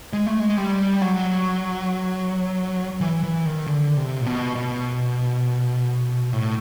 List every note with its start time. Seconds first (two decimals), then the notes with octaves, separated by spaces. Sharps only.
0.13 G#3
0.26 A3
0.39 G#3
0.57 G3
1.02 F#3
3.01 E3
3.23 E3
3.45 D#3
3.67 D3
3.97 C3
4.21 A#2
4.26 B2
4.55 B2
6.33 A2